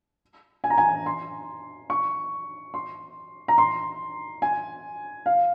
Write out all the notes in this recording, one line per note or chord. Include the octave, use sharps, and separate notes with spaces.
G#5
A#5
G#5
C6
C#6
C6
A#5
C6
G#5
F5